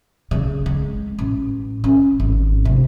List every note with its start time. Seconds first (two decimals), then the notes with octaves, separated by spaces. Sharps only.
0.31 C#3
0.66 G#3
1.19 A1
1.84 C#4
2.20 G#1
2.65 C3